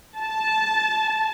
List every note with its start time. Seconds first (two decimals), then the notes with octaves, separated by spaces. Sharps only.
0.18 A5